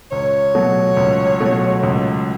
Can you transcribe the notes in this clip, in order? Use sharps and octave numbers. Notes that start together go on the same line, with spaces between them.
C#2 C#5
B2 F#3 A3
C#2
B2 F#3 A3
C#2